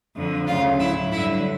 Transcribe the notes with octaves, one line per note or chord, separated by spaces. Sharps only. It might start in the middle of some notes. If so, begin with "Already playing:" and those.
F2 D3 F3
D2 C#3 F#3 F4 F5
A2 F#3 E4 E5
G2 D3 F#3 E4 E5